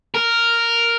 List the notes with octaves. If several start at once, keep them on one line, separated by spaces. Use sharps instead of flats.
A#4